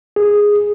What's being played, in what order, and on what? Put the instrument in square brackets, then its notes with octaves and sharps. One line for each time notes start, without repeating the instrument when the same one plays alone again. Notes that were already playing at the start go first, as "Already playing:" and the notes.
[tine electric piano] G#4